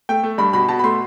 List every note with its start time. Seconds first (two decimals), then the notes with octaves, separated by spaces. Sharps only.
0.09 A3 G5
0.23 A3
0.38 G2 B5
0.53 B2 B5
0.68 B2 A5
0.79 B5
0.84 A3 C6